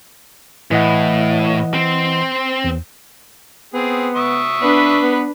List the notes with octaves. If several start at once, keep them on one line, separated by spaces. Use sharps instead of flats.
A2 E3 D#5 F#5
C4
E2
B3 C4 G#4
E5 C#6 D#6
B3 D4 B4
B3